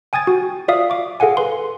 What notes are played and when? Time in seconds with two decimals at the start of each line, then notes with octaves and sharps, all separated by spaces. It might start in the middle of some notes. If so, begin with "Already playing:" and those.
0.13 G5 G#5 D#6 G#6 A6
0.27 F#4
0.68 F4 D5 E5 F5 D#6
0.90 C#6 D6
1.20 G#4 A4 F5 F#5 G#5
1.37 B4 C6